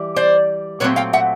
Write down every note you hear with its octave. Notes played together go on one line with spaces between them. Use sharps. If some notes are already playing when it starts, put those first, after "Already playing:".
Already playing: E3 G3
C5 D5
A#2 F#3 A3 C4 B4 C#5
F5 G5
E5 F#5